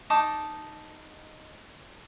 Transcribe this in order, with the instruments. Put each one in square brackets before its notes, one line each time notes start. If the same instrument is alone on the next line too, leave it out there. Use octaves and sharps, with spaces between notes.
[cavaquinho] D#4 A5 D6 D#6